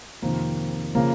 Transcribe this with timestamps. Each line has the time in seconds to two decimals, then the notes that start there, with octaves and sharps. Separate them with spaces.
0.22 F2 C3 D#3 A#3
0.95 C#3 F3 A#3